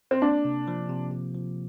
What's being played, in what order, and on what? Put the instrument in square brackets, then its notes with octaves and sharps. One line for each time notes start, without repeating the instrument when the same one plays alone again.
[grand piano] C4
[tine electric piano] A#3 [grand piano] D4
[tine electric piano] C3
F3
C3
C3
F3